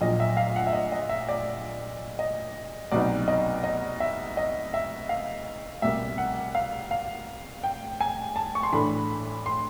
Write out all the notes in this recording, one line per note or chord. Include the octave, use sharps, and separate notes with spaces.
A#1 A#2 F#3 D#5
E5
F5
F#5
E5
D#5
D#5
E5
D5
D#5
C2 B2 F#3 B3 D#4 D5
D#5
D#5
E5
D#5
E5
F5
C2 B2 G3 A#3 E5
F#5
F5
F5
G5
G#5
A5
C#6
C6
A2 E3 A3 D4 B5
C6